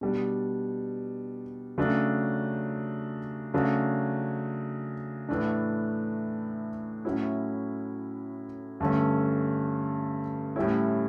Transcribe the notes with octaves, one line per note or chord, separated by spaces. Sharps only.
B2 G3 D4
C#3 F#3 A3 D4
C#3 F#3 A3 D4
A2 E3 A3 D4
A2 F#3 C#4 E4
G2 D3 A3 C#4
A2 G3 C#4 E4